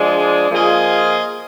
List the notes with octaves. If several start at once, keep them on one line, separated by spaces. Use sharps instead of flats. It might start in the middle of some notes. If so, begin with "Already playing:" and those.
Already playing: F3 G#3 D4 G#4 D5
F3 A#3 F4 G#4 D#5